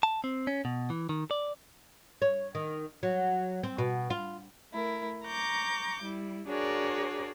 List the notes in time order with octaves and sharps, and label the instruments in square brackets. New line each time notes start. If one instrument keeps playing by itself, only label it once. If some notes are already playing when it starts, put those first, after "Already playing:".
[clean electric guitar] A5
C4
C#4
B2
E3
D#3
D5
[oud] C#5
D#3
F#3
C4
B2
F4
[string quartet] A3 E4 A#4
A#5 C#6 D6 G6
G3 E4
D4 F#4 G#4 A#4 C#5 D5